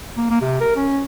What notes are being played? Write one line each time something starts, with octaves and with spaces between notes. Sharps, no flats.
A#3
A#3
C3
A#4
C#4